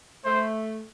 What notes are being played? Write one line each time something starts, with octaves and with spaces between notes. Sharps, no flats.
A3 C5